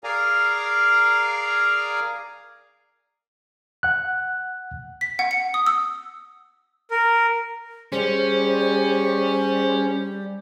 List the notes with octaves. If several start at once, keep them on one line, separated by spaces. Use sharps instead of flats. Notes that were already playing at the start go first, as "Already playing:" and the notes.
G#4 A#4 D5 F5 G#5 A#5
F#5 F#6
B6
F#5
C#7
D#6
E6
A#4
G3 C#4 G#4 C5